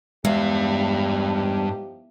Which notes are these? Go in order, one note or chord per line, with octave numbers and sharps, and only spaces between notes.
E2 G2 F3 G#3 D#4 G4 F5